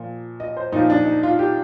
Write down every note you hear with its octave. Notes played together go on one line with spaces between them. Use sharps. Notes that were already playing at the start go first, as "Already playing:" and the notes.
Already playing: A#2 F3
D#5
C5
A#2 F3 D#4
D4
D#4
F4
G4